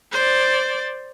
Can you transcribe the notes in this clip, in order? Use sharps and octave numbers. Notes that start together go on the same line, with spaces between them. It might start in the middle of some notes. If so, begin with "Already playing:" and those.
C5 D5